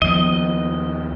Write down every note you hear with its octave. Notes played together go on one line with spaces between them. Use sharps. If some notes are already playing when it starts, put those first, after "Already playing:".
D#2 F3 B3 D#5